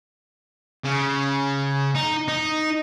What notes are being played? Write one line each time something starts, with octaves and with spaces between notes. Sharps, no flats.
C#3
D#4
D#4